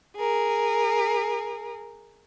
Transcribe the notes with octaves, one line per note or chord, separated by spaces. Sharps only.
G#4 A#4